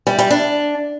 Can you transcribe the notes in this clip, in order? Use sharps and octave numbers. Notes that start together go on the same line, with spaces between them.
G3
G3
D4